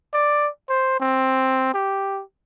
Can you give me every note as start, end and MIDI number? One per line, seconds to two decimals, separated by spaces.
0.13 0.49 74
0.69 0.97 72
1.00 1.73 60
1.74 2.22 67